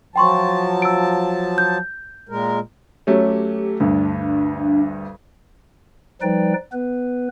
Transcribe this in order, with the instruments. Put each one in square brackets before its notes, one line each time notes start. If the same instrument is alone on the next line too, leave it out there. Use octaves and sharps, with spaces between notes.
[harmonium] F3 F#3 A5 [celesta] G5 C6 C#6
[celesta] E6 D7
G6
[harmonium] A#2 G#3 A#4
[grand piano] F#3 A3 C#4 [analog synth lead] G4
[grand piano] D2 G2 [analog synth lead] D4
[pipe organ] F3 G3 D#4 B4 D5 G5
B3 B4